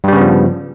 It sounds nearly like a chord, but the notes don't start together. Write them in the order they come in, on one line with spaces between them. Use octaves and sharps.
G2 G3 C#3 B3 F3